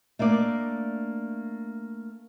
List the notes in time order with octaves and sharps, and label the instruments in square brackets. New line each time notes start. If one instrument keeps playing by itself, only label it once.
[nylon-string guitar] A3 A#3 D4 D5